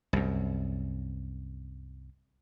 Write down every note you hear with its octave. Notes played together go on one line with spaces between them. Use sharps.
C2 F#2